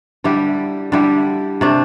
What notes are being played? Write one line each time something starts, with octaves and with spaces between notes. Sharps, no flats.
D3 G3 E4 G4
D3 G3 E4 G4
C3 A3 D4